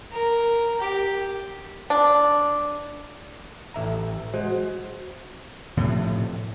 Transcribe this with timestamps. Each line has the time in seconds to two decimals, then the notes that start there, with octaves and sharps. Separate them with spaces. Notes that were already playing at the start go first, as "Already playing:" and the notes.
0.12 A#4
0.80 G4
1.90 D4
3.74 A1 E5 A#5
4.34 G#3 F#4 C5
5.77 A2 C3 F3